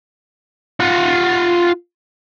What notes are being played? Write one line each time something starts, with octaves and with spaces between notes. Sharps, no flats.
F4 F#5